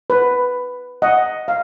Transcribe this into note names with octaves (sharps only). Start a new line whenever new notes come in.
B4
D#5 F#5
F5